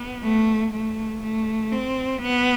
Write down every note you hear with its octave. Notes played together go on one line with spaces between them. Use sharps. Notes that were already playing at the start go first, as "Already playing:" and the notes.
Already playing: B3
A3
A3
A3
C4
B3